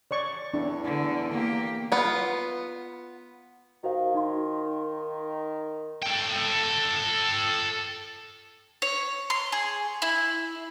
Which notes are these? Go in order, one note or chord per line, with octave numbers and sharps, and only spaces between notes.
C#5 D5 C#6
E2 D4
D3
A#3 G4
B3 F4
D#3 F#4 C5 F5
D#4 F5 C6
A4 G5
C#5
C6
G#4
E4